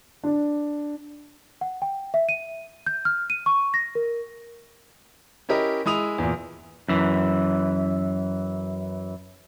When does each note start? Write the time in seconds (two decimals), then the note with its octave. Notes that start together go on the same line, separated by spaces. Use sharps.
0.24 D4
1.61 F#5
1.82 G5
2.14 E5
2.29 D#7
2.86 G6
3.05 F6
3.30 D#7
3.46 C#6
3.74 A#6
3.95 A#4
5.49 C#4 E4 G4 A#4 D#5
5.86 G#3 E4 D#6 F7
6.18 E2 A#2
6.89 F#2 E3